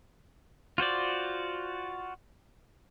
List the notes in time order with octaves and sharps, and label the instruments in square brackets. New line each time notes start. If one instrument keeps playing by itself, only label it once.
[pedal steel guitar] F4 F#4 C5 D5